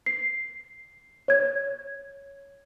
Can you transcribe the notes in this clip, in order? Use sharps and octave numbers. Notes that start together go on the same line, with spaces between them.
C7
C#5 G#6